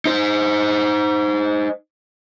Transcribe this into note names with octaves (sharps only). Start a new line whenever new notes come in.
D#4 C5